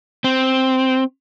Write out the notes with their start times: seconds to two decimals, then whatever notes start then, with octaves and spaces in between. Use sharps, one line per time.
0.24 C4